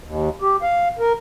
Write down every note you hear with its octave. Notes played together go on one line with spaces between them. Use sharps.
D#2
G4
F5
A#4